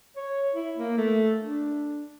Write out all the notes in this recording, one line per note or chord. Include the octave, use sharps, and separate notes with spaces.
C#5
E4
A#3
A3
D4